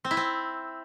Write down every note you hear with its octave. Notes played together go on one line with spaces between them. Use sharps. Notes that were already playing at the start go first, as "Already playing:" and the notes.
C4
E4
C4